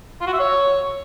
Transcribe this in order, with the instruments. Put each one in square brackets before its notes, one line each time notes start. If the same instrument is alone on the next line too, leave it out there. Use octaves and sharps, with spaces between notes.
[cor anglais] F4
F#4
E5
C#5